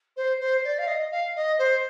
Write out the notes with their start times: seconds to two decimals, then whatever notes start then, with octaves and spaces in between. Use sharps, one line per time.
0.16 C5
0.40 C5
0.64 D5
0.78 F5
0.87 D#5
1.11 F5
1.35 D#5
1.58 C5